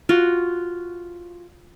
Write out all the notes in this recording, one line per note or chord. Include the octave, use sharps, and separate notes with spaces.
F4 F#4